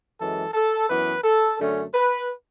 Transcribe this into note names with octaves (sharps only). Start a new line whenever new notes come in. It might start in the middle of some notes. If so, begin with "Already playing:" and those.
F#2 E3 G#3 A4
A4
F#2 E3 B3 B4
A4
F#2 D3 A3 C#4
B4